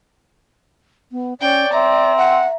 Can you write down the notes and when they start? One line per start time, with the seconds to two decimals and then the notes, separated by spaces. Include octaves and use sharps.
1.12 B3
1.41 C#4 C#5 D5 G5
1.73 C4 E5 A#5
2.17 F#5